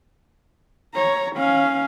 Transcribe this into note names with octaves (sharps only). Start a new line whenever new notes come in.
C#5 A#5
C#4 F5